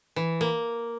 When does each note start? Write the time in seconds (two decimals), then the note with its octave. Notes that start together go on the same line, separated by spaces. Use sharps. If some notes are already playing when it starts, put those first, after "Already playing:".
0.16 E3
0.41 A#3